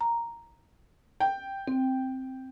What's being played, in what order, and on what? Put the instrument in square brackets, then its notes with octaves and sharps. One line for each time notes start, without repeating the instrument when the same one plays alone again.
[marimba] A#5
[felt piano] G5
[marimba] C4